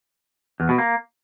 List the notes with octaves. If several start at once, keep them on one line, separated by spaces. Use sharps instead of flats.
E2
B2
A#3